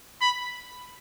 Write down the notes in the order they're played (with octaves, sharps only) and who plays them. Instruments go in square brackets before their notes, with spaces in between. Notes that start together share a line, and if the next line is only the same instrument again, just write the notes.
[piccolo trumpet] B5